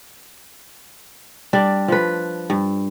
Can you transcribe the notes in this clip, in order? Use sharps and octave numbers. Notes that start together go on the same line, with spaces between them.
G3 D4
F3 B4
G2